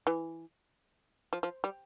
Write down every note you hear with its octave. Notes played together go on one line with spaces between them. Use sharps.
E3
F3
F3
G3